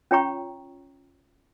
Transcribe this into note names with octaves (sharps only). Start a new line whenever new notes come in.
C#4 F4 C#5 G5 A#5 C#6